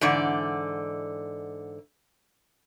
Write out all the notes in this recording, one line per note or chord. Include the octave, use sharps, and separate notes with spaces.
G#2 D3 E3 D5